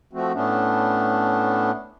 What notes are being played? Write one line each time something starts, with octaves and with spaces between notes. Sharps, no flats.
F3 A3 C4 F#4
A2 A3 B3 C#4 D4